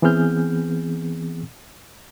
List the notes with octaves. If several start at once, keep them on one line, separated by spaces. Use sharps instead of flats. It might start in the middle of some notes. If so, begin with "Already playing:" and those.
E3 B3 C4 G#4 F6 G6